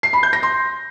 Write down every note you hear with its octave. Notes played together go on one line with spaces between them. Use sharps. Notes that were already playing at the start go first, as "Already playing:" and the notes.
C7
B5
G6
A#6
C6